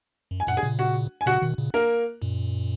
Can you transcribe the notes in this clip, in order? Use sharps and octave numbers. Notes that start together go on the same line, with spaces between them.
F#2
G#5
F#2 A#2 F#5
G#4 G#5
A#2 C#3
F#4 F#5
G#5
A#2 C#3 F#4 F#5
B2 D#3
A#2 C#3
A#3 A#4
F#2 A#2